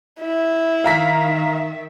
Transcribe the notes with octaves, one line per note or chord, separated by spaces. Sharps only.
E4
D#3 E5 F5 A#5 B6